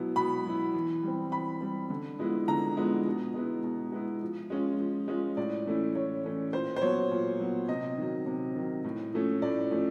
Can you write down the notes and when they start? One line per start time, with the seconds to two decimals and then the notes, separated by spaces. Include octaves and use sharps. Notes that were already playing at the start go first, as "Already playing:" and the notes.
Already playing: B2 F#3 B3 E4
0.16 B2 B5
0.45 F#3 B3 E4
0.74 E3
1.03 G3 C4
1.32 E3 B5
1.61 G3 C4
1.90 D3
2.19 F3 G#3 B3 E4
2.48 D3 A#5
2.77 F3 G#3 B3 E4
3.06 B2
3.34 G#3 B3 E4
3.63 B2
3.92 G#3 B3 E4
4.22 F3
4.50 G#3 C#4 F4
4.79 F3
5.08 G#3 C#4 F4
5.37 A2 D5
5.66 E3 A3 C#4 E4
5.95 A2 C#5
6.24 E3 A3 C#4 E4
6.53 A#2 C5
6.76 C5
6.82 F#3 B3 C#5
7.11 A#2
7.40 F#3 B3
7.68 C3 D#5
7.98 D#3 F#3
8.26 C3
8.55 D#3 F#3
8.84 A2
9.13 F3 A3 C#4
9.42 A2 D5
9.71 F3 A3 C#4